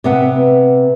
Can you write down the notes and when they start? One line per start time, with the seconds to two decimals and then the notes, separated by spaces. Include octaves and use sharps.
0.04 C3 B3 F#5